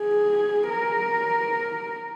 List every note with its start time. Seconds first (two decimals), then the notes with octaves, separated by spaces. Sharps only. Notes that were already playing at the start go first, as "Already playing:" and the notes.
Already playing: G#4
0.69 A#4